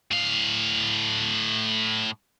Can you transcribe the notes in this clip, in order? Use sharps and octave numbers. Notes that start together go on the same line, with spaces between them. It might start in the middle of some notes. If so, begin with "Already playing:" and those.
A2 F5